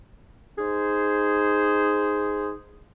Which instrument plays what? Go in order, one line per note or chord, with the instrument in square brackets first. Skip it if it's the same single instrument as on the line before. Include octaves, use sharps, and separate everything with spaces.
[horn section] D#4 G#4 C5